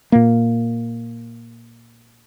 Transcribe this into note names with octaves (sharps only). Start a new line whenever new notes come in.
A#2 A#3